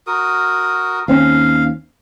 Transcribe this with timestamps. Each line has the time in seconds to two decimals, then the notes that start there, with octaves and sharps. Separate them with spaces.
0.07 F#4 A#4 D#6
1.08 D#2 C4 C#4 F5